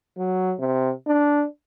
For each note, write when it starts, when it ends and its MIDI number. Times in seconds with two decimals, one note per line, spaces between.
0.18 0.54 54
0.59 0.92 48
1.07 1.44 62